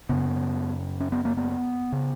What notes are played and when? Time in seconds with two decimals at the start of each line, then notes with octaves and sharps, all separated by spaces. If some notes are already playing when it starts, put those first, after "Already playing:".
0.09 F#2 C#3 B3
1.00 C#4
1.12 B3
1.25 A#3
1.37 B3
1.92 C#3